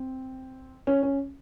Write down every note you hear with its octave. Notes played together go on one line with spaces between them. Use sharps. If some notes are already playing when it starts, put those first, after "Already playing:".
Already playing: C4
C#4
C#4